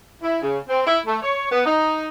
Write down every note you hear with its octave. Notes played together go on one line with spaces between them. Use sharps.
E4
C#3
C4
E4
A3
C#5
B3
D#4